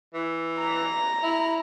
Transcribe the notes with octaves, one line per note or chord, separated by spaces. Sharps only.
E3
A#5
E4